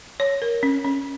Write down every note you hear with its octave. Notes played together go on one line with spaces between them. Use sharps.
C#5
A#4
C#4
C#4